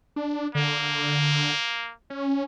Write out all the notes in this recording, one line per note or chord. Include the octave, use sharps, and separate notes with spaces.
D4
D3 A#3
C#4